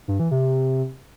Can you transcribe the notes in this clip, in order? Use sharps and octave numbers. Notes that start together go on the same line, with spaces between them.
G2
E3
C3